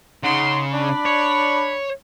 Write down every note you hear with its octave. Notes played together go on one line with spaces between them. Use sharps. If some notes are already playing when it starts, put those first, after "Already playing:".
C#3 D#4 F#5 C6
D4 D5 B5
C#5